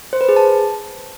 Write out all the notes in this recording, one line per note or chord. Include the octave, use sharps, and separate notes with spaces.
C5
B4
G#4
A5